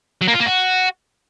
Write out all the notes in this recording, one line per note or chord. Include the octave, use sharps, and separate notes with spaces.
F#3
A#3
F4
A#3
F#4